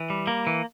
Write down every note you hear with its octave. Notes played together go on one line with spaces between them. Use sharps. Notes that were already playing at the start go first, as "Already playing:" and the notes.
Already playing: E3
G3
A#3
E3